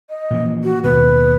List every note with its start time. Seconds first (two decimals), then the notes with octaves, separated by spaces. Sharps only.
0.10 D#5
0.31 A#2 E3 F3
0.64 F#4
0.84 D#2 B2 B4